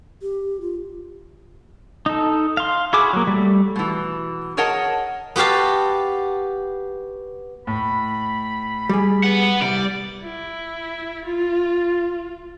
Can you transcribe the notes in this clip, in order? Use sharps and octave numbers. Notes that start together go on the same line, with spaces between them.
G4
F4
D#4 A4
F5 C6
E4 F#4 G#4 D6
F#3 A#3
G3 A3
B2 E3
G#4 A#4 C#5 D#5 F#5 A5
B3 F#4 G4 F5 A5
A2 B5
G3 G#4
B3 B4 F#5 B5
C2 G3 D5
E4
F4